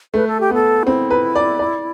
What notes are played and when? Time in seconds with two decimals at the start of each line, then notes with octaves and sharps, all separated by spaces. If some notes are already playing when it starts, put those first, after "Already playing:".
0.14 A3 B4
0.27 A4
0.40 G4
0.50 B3 A4
0.86 C4 E4
1.10 B4
1.35 D5
1.59 D5